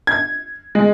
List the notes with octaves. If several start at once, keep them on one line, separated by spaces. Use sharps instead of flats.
G#6
G#3